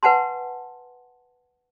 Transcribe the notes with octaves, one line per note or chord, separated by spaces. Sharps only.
B4 F#5 G#5 A5 C6